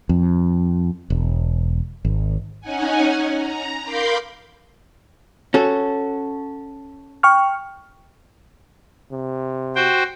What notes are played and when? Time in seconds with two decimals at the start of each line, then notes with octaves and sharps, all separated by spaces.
0.09 F2
1.10 E1
2.05 G#1
2.61 C#4 D#4 F#5 G#5
3.36 A#5
3.82 A#4 F5 B5 C6 D6 G6
5.54 C#4 F#4 A4
7.23 G5 C#6 F6
9.12 C3
9.76 F#4 C5 G5